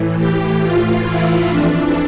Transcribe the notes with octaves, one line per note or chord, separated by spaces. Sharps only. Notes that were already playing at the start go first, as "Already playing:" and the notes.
Already playing: A2 E3
G4
A2 E3 F4
E4
F2 E3 D4